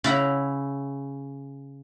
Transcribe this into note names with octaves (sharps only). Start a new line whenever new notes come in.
C#3 E4 F#5 A#5